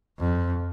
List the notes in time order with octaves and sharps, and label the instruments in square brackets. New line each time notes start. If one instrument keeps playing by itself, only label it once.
[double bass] F2